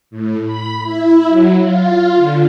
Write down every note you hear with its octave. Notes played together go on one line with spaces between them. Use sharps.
A2
B5
E4
F#3
F4
D3